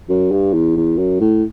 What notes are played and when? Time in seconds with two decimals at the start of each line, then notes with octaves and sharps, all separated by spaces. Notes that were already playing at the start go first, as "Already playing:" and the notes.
0.09 F#2
0.32 G2
0.54 E2
0.76 E2
0.98 F#2
1.20 A2